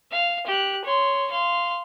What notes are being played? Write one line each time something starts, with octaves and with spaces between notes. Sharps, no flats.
F5
G4 F#6
C#5 C6
F5 C6